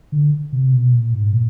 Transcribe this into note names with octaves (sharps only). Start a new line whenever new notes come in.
D3
C3
B2
A#2
G#2
A#2